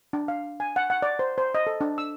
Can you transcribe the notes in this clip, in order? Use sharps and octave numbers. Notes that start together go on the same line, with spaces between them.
D4
F5
G#5
F#5
F#5
D5
C5
C5
D#5
A4
D4
E6